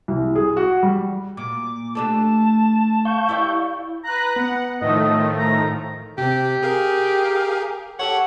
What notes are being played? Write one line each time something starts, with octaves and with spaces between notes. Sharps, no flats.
C2
G#4
F#4
G3
A#2 D6
A3 D4 G4 A5
F5 C#6 G6
E4 G4 D5
B4 A#5 F#6
B3 F#5
A2 D#3 F3 A3 D#5
A#5
C3 C4 G4
G#4 A#4 F5
G4 A4 C#5 F#5